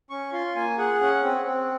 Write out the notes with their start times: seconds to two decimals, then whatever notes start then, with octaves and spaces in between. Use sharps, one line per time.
0.10 C#4 C#6
0.33 F4 C6
0.55 A#3 G#5
0.78 G#4 F#5
1.01 C#4 F#5
1.24 C4
1.46 C4